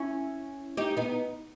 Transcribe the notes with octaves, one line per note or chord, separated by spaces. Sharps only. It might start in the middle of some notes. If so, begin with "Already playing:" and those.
Already playing: C#4 E4
D#4 G4
B3 D#4